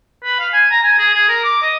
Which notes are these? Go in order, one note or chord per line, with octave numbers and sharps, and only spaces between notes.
B4
F5
G#5
A#5
G#5
G#4
G#4
A#4
D6
D#5